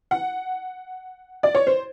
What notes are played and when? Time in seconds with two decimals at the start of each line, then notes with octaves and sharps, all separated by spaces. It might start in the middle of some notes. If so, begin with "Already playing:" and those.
0.11 F#5
1.43 D5
1.55 C#5
1.67 C5